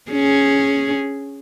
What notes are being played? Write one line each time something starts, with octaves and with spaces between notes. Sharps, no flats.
C#4 G#4